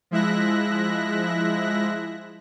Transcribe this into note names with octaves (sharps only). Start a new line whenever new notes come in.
F3 G#3 E4 E5 F#6 A#6